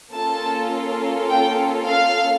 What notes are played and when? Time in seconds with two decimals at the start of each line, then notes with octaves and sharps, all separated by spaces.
0.14 A#3 C#4 F4 A4 A5
1.30 G5
1.88 F5